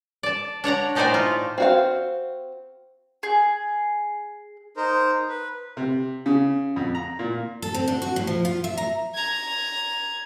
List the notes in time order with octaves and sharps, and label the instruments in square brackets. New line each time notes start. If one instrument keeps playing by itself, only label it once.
[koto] D5 A5
D4 C#5 F#5 A#5
A2 A3 D#4 C5 D5 G#5
F4
[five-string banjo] C4 F#4 F5
[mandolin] G#4
[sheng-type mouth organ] D#4 A#4 C5
B4
[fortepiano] C3
C#3
F2
A#5
A#2
[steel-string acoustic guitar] A4
C4
D3
F#4
A2
F3
F4
E5
A#5
[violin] A#5 G#6